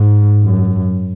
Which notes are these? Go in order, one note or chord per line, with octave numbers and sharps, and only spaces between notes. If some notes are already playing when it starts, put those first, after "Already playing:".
Already playing: G#2
F#2